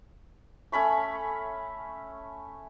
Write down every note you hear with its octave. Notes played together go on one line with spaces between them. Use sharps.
A3 C#4 B5 C#6